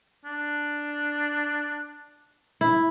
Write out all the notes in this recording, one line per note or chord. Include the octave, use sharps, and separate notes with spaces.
D4
E4